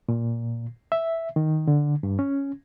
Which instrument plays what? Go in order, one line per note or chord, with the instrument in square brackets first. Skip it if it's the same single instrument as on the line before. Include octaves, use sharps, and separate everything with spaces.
[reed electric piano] A#2
E5
D#3
D3
G2
C#4